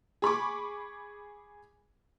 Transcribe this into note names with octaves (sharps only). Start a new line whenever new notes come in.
G#4 B5 C#6 D6